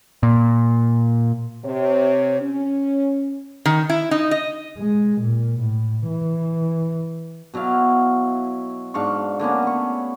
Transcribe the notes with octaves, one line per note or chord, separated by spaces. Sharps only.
A#2
C3 C#5
C#4
D#3
E4
D#4
D#5
G#3
A#2
A2
E3
B2 F#3 E4 F5
G#2 D4 F5 C#6
D3 A#3 B3 C#4
A3 C#6